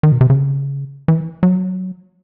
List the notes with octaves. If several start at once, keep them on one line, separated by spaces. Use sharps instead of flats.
D#3
B2
C3
C#3
E3
F#3